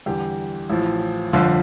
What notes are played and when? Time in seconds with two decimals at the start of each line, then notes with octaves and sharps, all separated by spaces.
0.06 E2 D3 G3 G4
0.70 A1 A2 F3
1.33 G1 F2 D3 F3 F4